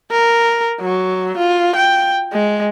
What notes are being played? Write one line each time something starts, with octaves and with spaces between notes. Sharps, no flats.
A#4
F#3
F4
G5
G#3